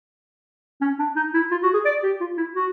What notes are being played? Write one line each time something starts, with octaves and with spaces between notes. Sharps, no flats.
C#4
D4
D#4
E4
F4
F#4
G#4
D5
G4
F4
E4
F#4